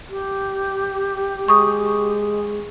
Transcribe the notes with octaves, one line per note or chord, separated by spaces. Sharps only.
G4
G#3 C#6 D#6